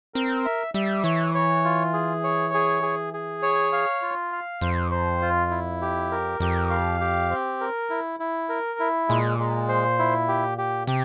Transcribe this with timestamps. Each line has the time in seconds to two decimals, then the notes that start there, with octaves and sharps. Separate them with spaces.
0.14 C4 A#4
0.45 E5
0.74 G3 E5
1.04 E3 C#5
1.35 C#5
1.65 F4
1.93 G#4
2.23 C#5
2.54 G#4
2.83 G#4
3.14 G#4
3.43 C#5
3.73 F5
4.02 F4
4.32 F5
4.61 F2 C5
4.91 C5
5.22 F4
5.51 E4
5.82 G4
6.11 A#4
6.40 F2 G4
6.70 F5
7.01 G4
7.30 C4
7.61 A#4
7.90 E4
8.20 E4
8.49 A#4
8.79 E4
9.09 A#2 G#3
9.39 G#3
9.69 C5
9.99 E4
10.28 G4
10.58 G4
10.87 C3 G4